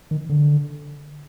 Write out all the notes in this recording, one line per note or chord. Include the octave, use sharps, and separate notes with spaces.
D#3
D3